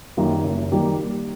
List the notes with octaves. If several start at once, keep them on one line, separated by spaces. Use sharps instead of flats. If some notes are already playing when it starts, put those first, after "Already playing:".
F#2 D#3 G3 A#3
F#1
D#3 G3 A#3